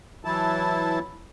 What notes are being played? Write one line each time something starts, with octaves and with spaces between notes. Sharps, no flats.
E3 F#3 E4 A5